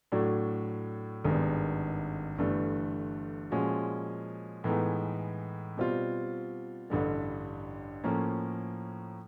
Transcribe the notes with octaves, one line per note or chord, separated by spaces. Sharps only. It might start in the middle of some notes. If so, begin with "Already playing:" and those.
A2 F#3 A3 D4 F#4
G#1 G2 D#3 G#3 B3
G1 G2 E3 A3
A#2 F3 G#3 C#4 F#4
A2 E3 G#3 B3 D#4
B2 G3 C4 F4
A1 G2 D3 G3
A2 F3 A#3 C#4